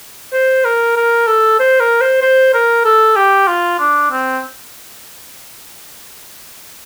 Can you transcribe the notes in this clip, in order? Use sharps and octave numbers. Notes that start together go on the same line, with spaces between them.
C5
A#4
A#4
A4
C5
A#4
C5
C5
A#4
A4
G4
F4
D4
C4